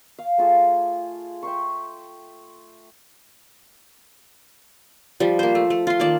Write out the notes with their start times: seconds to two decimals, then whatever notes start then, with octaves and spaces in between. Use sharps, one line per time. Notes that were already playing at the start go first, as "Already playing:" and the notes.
0.19 F5
0.38 A3 F4 G#4 A5
1.43 E5 G5 C6 C#6
5.20 F3 G3
5.39 A#3 C5
5.55 A3
5.70 A3
5.87 F4 C6
6.00 D#3 A#3 D5 A5